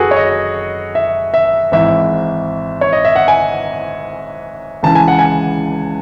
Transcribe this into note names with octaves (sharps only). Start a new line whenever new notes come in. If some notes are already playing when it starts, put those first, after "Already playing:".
Already playing: F#1 F#4 G#4 A4 B4
C#5
D#5
E5
E5
G#1 G#2 E3 E5
C#5
D#5
E5
F#5
G#5
C#2 C#3 E3 A5
G#5
F#5
G#5